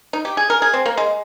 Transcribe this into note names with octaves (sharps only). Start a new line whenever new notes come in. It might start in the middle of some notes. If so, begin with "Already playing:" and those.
D#4
G4
G#4
A#4
G#4
C4
A#3
G#3